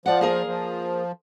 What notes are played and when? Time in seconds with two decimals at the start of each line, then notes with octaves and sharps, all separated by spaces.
0.06 F3 D5 F#5
0.21 A#3 G#4 A#4
0.47 F3